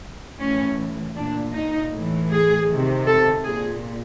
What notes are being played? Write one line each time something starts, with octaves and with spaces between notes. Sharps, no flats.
A2 E3 C#4
A#2 D4
D#4
A2 E3
G#4
C3 D#3
A4
A#2 G#4